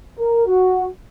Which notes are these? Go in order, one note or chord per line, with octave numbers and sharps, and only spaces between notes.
A#4
F#4